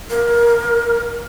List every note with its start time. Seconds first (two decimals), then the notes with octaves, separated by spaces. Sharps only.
0.11 A#4